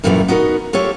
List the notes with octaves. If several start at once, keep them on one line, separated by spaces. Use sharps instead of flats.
F#2 A#2 E3 G3 A3 B3
B3 D#4 F#4 G#4 A#4
F4 G4 A4 C#5